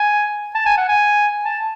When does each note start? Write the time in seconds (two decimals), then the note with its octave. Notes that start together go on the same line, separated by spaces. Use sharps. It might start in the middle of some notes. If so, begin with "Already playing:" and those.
Already playing: G#5
0.55 A5
0.66 G#5
0.78 F#5
0.89 G#5
1.45 A5